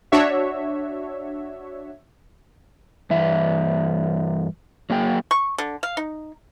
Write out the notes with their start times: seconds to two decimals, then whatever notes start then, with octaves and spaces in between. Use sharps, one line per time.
0.12 D4 F#4 C#5 E5
3.10 G2 E3 E5
4.90 F#3 A#3 G#4 G5
5.31 C#6
5.58 D3
5.83 F5
5.97 D#4